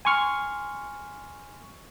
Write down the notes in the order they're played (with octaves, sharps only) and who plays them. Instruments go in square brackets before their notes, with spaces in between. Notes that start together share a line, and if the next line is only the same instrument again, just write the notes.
[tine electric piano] G#5 C6 C#6 F6